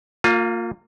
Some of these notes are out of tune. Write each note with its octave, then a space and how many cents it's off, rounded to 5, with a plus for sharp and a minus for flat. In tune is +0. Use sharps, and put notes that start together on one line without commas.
A#3 -25 F4 +20